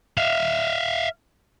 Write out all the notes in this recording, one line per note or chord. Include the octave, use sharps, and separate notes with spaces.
E5 F5